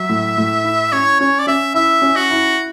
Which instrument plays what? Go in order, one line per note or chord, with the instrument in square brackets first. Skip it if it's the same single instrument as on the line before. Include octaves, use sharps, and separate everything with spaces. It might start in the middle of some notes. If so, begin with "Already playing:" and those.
Already playing: [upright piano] F#3 [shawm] E5
[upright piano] A2
A2
E4
[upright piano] C#4 [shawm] C#5
[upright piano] C#4 [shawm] C#5
[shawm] D5
[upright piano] C#4 [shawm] E5
[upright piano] E4 [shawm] E5
[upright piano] C#4
[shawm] F#4
[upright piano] E4